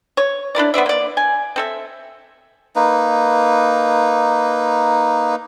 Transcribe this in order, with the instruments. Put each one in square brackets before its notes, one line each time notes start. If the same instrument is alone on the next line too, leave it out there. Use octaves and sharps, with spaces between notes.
[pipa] C#5
D4 E4 A#4 D5
B3 C5 D5 E5
A#3 D5
G#5
C4 A4 E5
[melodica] A#3 D#4 B4